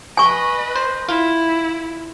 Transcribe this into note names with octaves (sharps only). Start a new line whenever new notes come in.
B4 D#5 G#5 C#6
C5
E4 F4